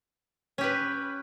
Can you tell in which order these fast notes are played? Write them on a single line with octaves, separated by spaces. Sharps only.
C#4 G4 B4